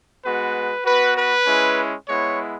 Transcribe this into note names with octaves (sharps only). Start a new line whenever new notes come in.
G#3 B3 F#4 B4
B3 F#4 B4
B4
G#3 C#4 E4
G#3 B3 E4 C#5